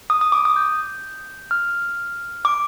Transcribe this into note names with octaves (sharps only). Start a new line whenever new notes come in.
D#6
D#6
D6
D#6
G6
F6
D6